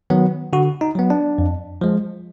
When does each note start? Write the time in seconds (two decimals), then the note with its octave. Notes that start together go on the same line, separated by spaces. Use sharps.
0.10 D#3 F#3 B3
0.53 D3 F#4
0.81 D#4
0.95 F#3 B3
1.10 D4
1.38 F2
1.81 F3 G#3